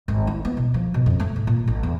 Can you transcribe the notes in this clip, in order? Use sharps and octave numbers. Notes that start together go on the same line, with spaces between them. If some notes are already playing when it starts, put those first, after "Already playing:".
G#1
E4
B3
B2
F3
B2
F2
A3
G#2
A#2
A1
E2